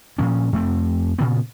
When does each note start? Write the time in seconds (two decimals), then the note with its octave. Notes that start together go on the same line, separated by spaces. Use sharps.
0.18 A#2 F3 C#4
0.53 F2 A3 C4
1.18 A#2 C#3 B3